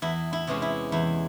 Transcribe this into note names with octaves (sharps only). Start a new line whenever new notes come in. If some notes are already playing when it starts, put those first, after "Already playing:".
E2 E4
E4
C3 E3 G#3 C#4
E4
E2 E4